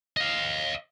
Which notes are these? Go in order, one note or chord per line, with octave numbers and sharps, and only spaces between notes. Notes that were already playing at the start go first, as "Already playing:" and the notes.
D#5 F5